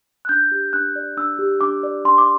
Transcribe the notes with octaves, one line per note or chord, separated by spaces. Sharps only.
F#6
D4 G6
G4
D4 F#6
D5
D4 E6
G4
D4 D6
D5
D4 C6
D6